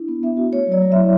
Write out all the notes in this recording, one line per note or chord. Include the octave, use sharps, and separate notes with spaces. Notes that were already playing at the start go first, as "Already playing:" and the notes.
Already playing: D4 E4
B3
B3 E5
F#4
A3 C#5
F#3 D5
F#3
E5
E4